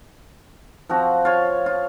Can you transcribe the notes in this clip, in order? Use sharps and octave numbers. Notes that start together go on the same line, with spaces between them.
F3 C4 F#4
F4 C#5
F4